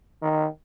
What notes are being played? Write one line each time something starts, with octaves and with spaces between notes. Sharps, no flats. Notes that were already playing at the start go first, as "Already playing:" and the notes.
D#3